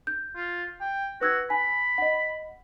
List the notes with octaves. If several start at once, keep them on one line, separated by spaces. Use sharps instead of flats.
G6
F4
G5
F#4 B4 E6 G#6
G#5 B5
D#5 F#5